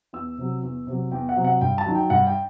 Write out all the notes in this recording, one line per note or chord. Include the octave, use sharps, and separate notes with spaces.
E2 E6
C3 F#3
E2
C3 F#3
E2 G5
F#5
C3 F#3
F#5
G2 G5
A5
D#3 F#3
G5
G2 F#5
G5